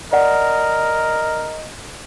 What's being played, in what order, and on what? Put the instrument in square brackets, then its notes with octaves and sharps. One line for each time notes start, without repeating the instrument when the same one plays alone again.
[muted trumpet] A#4 [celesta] D5 F#5 [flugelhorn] D#5